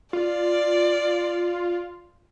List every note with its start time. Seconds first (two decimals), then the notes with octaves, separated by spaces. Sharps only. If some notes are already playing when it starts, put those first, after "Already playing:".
0.13 F4 D5